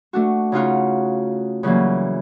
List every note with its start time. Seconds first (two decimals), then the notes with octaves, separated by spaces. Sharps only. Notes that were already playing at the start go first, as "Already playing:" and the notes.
0.13 A3 D4 F#4
0.52 C#3 D#4 F4 F#4
1.63 C#3 E3 F#3 G3 A#3